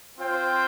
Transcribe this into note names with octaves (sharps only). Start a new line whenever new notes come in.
C4 F4 C5 G5